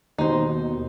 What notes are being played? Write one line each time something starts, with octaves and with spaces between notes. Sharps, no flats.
D#2 B2 D#4 C5